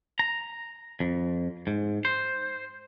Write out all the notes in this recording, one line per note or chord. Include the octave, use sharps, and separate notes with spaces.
A#5
F2
G#2
C5